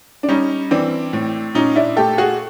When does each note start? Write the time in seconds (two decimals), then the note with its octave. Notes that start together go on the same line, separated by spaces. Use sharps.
0.23 D4
0.28 G3 C#4 D#4
0.71 E3 C4 D4
1.13 A2
1.54 A#2 C#4 D#4
1.76 D4 E4
1.97 A3 G4 A4
2.18 F#4 G#4